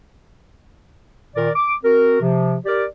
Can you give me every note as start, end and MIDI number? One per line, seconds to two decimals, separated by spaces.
1.35 1.50 46
1.35 1.50 51
1.35 1.50 70
1.35 1.50 74
1.56 1.73 86
1.84 2.18 60
1.84 2.18 66
1.84 2.18 70
2.21 2.56 48
2.21 2.56 53
2.66 2.84 67
2.66 2.84 70
2.66 2.84 74